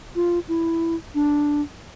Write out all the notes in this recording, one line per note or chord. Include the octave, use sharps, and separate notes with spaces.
F4
E4
D4